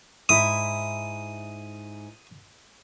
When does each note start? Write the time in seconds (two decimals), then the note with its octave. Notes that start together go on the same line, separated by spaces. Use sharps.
0.29 G#2 E4 D#6